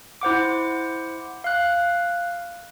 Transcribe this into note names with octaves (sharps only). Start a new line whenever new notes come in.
E4 C5 F#5 D6
F5 F#6